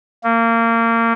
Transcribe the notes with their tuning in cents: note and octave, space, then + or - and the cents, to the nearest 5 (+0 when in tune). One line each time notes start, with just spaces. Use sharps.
A#3 -25